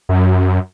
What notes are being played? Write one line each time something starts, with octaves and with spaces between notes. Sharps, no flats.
F#2